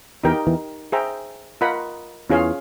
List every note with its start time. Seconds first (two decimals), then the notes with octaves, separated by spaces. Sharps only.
0.24 E2 E3 D#4 G4 A#4 D#5 G5
0.47 E2 E3
0.92 G#4 C5 E5 G5 A#5
1.61 F4 A#4 D#5 F#5 B5
2.29 E2 E3 C#4 F4 G#4 C#5 F5